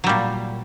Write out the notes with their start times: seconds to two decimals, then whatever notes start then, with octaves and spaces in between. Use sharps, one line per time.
0.04 F#3
0.07 G3
0.09 A#2